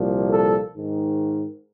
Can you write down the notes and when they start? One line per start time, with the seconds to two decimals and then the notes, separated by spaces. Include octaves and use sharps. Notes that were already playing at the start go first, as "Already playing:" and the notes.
Already playing: C2 A#2 F3
0.30 A4
0.74 G#2 D#3